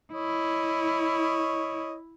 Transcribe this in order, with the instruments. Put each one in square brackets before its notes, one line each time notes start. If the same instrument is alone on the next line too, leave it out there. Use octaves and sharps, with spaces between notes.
[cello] E4 [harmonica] C#5 D#5